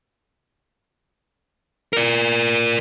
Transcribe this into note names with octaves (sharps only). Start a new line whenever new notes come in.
A#4 D5